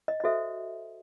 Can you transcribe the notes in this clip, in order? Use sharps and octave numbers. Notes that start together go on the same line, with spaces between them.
D#5
D#5
F#4 A4 C5 E5